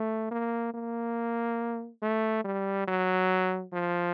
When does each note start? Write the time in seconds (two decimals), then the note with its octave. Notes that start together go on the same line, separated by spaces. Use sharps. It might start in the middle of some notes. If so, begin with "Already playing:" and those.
Already playing: A3
0.31 A#3
0.74 A#3
2.02 A3
2.44 G3
2.88 F#3
3.73 F3